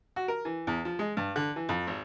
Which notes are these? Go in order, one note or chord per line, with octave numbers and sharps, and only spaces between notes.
F#4
A#4
E3
E2
F3
G#3
G2
D3
E3
F2
G#1